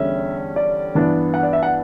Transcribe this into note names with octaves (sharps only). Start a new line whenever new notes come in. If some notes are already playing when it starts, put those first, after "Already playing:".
Already playing: E2 D3 G3 C#4 E5
D5
G2 E3 B3 D4
F#5
D5
E5
F#5